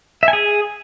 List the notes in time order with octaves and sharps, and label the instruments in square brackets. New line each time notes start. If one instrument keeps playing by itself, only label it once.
[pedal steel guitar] E5
G#5
G#4